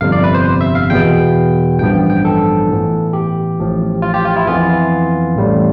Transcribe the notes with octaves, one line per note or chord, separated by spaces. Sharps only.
G1 F2 C3 F5
D5
B4
C5
E5
F5
E2 B2 B3 G5
A1 G2 F3 B3 G5
G5
A4
A2 E3 B3
G4
A1 A2 F3
F4
G4
F4
E4
F2 E3 B3 F4
A1 A2 G3